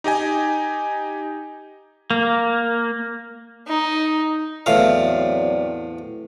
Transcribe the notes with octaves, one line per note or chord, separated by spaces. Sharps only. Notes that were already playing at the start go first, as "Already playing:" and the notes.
D#4 G4 D#5 G#5
A#3
D#4
E2 A2 F#3 C4 D5 F5